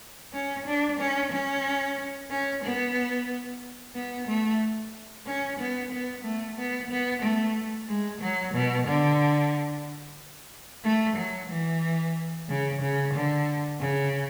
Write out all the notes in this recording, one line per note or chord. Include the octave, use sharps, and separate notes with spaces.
C#4
D4
C#4
C#4
C#4
B3
B3
A3
C#4
B3
B3
A3
B3
B3
A3
G#3
F#3
B2
D3
A3
F#3
E3
C#3
C#3
D3
C#3